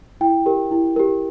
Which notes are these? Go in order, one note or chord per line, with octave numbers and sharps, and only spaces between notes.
E4 G5
G4 A#4
E4
G4 A#4